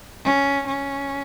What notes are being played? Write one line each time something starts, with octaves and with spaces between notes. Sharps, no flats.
C#4
C#4